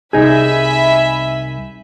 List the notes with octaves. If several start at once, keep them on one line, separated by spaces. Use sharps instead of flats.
C2 D#4 G#4 E5 G#5 B5